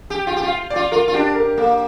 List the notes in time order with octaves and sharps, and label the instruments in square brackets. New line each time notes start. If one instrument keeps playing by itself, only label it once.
[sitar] G4
[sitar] F4 [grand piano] G5
[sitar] G4
F4
[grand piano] F5
D5
[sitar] F4
[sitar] F4 [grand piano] A#4
[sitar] F4
[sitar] D4 [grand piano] G4
[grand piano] A#4
[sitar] A#3 [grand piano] A#4